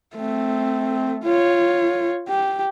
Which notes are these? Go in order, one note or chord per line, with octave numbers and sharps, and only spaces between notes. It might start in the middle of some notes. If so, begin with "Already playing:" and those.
A3 C4
F4 C#5
G4